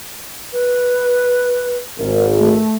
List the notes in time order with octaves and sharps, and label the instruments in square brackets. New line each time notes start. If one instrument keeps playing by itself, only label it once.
[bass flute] B4
[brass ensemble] G#1 [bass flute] A#4
[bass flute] A3